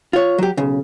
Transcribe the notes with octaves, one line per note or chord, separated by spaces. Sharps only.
F4 C#5
F#3 G4
B1 C#3